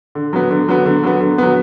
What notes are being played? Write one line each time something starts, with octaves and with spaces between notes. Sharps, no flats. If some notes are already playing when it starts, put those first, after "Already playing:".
D3
F#3 B3
D3
F#3 B3
D3
F#3 B3
D3
F#3 B3